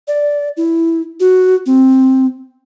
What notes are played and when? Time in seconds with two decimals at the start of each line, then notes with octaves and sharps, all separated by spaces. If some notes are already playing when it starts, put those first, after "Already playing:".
0.08 D5
0.57 E4
1.20 F#4
1.66 C4